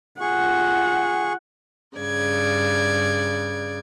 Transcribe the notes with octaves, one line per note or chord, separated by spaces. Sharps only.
F4 G#4 F#5 C#6
G2 C#3 D5 G#6